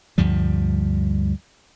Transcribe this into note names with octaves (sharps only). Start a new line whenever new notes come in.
D2 G2 F3 G3